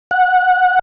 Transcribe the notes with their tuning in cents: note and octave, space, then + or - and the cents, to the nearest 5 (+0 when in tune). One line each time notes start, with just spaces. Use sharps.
F#5 -15